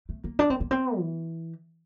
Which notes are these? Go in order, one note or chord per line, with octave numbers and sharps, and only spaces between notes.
A3
A#3
D4
C4
A#3
C4
E3